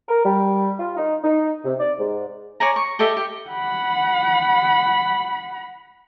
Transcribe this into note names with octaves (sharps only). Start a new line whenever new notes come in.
A#4
G3
F4
D#4
D#4
C3
D5
G#2
C#5 D5 G#5 A#5
C#6
G4 A4 D#5 E5
G4
F#5 B5